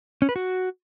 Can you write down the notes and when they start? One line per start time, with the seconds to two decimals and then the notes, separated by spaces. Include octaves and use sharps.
0.22 C#4
0.29 B4
0.36 F#4